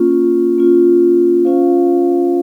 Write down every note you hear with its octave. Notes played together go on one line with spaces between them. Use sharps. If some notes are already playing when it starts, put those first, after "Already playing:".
Already playing: A#3 C#4 F4
A#3 C#4 F4
C#4 F4 C5 F5